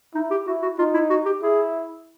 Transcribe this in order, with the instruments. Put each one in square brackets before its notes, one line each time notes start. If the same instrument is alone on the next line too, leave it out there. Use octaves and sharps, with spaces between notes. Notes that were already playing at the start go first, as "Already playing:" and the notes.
[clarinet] D#4 [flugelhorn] E4
[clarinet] G4
[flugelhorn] E4 [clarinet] F#4
[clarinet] F#4
[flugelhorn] D#4 [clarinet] F4
[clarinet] E4
F#4
G4
[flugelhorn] E4 [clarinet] G#4